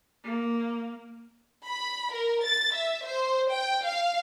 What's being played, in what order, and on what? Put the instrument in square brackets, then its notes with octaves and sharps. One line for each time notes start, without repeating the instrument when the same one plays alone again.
[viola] A#3
[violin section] B5
A#4
A6
E5
C5
G5
F5